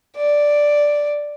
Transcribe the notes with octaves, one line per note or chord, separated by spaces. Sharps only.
D5